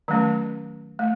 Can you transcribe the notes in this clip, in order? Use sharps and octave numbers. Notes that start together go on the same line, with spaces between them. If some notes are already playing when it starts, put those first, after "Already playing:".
D#3 F#3 A3 C#4
A3